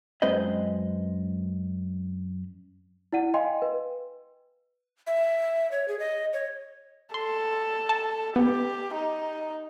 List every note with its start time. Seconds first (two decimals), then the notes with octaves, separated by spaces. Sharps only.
0.22 F#2 G#3 C4 B4 C5 D#5
3.13 E4 D5 F#5 D#7
3.34 D#5 F5 G5 G#5 C6
3.62 B4
5.07 E5
5.71 C#5
5.88 G#4
5.99 D#5
6.33 C#5
7.14 A4 C6
7.89 A5
8.36 B3 G4
8.94 D#4